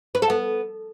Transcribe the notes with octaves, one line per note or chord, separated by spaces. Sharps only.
B4
A4
B3